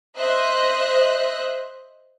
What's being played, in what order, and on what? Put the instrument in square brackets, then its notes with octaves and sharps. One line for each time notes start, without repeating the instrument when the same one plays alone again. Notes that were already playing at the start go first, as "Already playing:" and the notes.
[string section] C5 D#5 E5 F#6